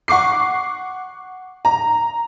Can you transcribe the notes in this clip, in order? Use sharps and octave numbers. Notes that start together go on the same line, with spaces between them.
F#5 C#6 D6 C7
A#5